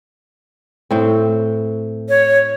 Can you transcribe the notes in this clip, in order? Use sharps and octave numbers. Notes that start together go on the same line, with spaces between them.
A2 C4
C#5